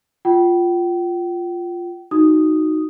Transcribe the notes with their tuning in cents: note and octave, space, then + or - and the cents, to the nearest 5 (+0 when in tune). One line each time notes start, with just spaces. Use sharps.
F4 +0 G5 -35
D#4 +0 F#4 +0 D#6 +0